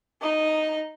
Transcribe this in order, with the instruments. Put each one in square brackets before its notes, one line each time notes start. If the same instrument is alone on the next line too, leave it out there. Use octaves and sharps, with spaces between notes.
[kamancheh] D#4 D#5